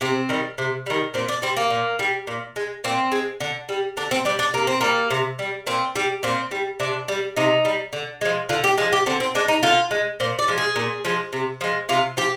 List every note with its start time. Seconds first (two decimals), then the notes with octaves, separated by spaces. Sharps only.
0.01 C3 C4
0.29 D#3 G3
0.58 C3
0.86 D#3 G3
1.14 A#2 C4
1.28 D4
1.42 G3 C4
1.57 A#3
1.70 A#2
1.99 G3
2.27 A#2
2.56 G#3
2.84 A#2 C4
3.12 G#3
3.40 D3
3.69 G3
3.97 D3 D4
4.11 C4
4.25 G3 D4
4.39 D4
4.54 C3 A#3
4.67 C4
4.81 G3 A#3
5.11 C3
5.39 G3
5.67 A#2 C4
5.96 G3
6.23 A#2 C4
6.51 G3
6.80 C3 D4
7.08 G3
7.36 C3 D#4
7.65 G3
7.93 D3
8.21 F3 G#3
8.49 D3 F4
8.64 G4
8.78 F3 G#3 G#4
8.92 G4
9.06 D3 C4
9.20 C4
9.35 G#3 D4
9.48 D#4
9.63 D3 F4
9.91 G#3
10.20 A#2 C5
10.39 D5
10.48 F3 G#3
10.58 G#4
10.76 A#2
11.05 F3 G#3
11.33 C3
11.61 F3 G#3
11.89 C3 F4
12.17 F3 G4